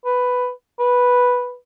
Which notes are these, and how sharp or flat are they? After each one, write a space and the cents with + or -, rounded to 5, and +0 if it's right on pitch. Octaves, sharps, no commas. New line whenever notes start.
B4 +5
B4 -5